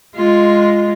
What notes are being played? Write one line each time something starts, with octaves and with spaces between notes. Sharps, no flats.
G#3 F4